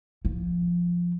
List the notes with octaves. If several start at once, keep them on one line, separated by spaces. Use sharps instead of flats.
F3